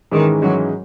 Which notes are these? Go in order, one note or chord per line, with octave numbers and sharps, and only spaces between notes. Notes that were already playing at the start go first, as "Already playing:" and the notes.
G#2 D#3 E3 G#3 C#4
G#2 E3 F#3 G#3 C#4